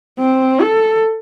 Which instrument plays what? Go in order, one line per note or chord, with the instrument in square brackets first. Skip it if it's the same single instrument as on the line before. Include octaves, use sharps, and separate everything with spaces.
[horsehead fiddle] C4
A4